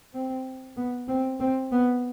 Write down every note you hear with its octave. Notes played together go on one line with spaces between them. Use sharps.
C4
B3
C4
C4
B3